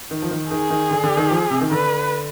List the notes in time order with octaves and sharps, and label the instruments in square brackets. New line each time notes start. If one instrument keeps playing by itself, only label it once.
[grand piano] D#3
F3
D#3
[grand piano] D#3 [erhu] G#4
[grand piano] D#3
D3
D3
D#3
F3
C3
D#3
[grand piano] D3 [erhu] B4